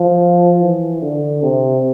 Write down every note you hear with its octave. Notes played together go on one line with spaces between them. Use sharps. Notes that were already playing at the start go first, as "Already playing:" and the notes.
Already playing: F3
E3
D3
C3